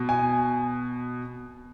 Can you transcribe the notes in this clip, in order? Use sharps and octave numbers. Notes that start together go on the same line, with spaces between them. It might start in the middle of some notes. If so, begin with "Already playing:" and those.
Already playing: B2
G#5